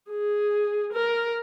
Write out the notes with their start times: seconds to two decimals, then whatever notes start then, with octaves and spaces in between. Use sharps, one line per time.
0.11 G#4
0.93 A#4